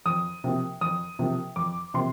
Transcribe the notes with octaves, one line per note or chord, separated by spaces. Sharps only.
F2 D#6
C3 F3 A#3
F2 D#6
C3 F3 A#3
F2 D6
C3 F3 A#3 C6